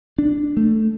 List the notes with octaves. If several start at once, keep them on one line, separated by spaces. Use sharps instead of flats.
D4
A3